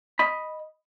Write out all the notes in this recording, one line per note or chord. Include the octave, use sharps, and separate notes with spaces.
D#5 B5